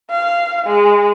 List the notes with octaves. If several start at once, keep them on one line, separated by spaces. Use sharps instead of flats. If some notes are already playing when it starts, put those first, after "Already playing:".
F5
G#3